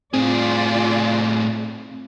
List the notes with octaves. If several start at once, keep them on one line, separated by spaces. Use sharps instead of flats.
A2 C4 F4 G#4 D5